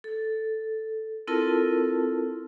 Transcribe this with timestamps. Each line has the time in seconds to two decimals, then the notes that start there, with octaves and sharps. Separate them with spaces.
0.04 A4
1.27 C4 E4 F4 A4 A#4 A5